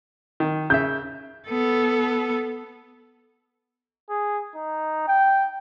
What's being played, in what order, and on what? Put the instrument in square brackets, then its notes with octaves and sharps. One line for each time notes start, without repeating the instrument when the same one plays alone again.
[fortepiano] D#3
[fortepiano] C#3 E5 [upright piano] G6
[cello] B3 A4
[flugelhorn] G#4
D#4
G5